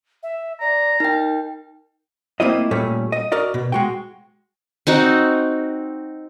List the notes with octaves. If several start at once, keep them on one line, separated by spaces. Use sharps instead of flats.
E5
D5 A#5
D#4 A#4 G5
A3 A#3 C4 E4 F4 D#5
A#2 G3 A3 C#4
D#5
F#4 A#4 D5 D#5
B2
G#3 F#4 G5
C4 D#4 F#4